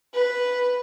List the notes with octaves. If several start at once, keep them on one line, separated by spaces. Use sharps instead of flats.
B4